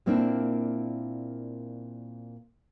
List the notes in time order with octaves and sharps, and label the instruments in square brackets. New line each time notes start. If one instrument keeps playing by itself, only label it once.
[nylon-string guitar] A#2 A#3 C4 D4 E4